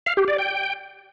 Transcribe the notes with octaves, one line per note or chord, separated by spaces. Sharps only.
F5
G4
D5
G5